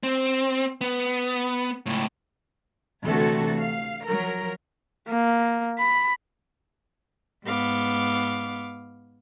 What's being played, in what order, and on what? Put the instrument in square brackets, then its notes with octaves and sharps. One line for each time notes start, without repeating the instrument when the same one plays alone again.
[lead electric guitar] C4
B3
C#2 A2
[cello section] D2 C3 E3 A3 F#4 A4
F5
F3 F#3 A#4
[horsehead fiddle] A#3
B5
[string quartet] G#2 B3 F5 D6